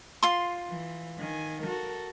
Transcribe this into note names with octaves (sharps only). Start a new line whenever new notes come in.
F4 C6
E3
D#3 G#5
F#4 A4 A#4